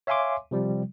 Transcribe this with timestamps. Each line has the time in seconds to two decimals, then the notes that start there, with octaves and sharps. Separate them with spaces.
0.07 C#5 E5 F5 G#5 C6 D6
0.51 C3 F3 G3